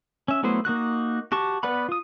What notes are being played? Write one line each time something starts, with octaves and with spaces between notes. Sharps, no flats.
C#4 E5
F#3 A3 B3 E4 C5
A#3 D#4 F#4 F#6
F#4 G4 A5 C#6
B3 B4 D5 F#5 B5
F4 D#6